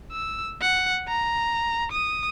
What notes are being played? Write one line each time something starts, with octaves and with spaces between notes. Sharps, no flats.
E6
F#5
A#5
D#6